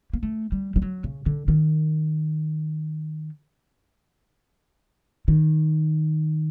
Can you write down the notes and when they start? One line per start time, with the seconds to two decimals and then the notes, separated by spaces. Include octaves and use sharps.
0.13 A#3
0.23 A3
0.52 G3
0.76 G3
0.82 F#3
1.04 C#3
1.26 D3
1.48 D#3
5.28 D#3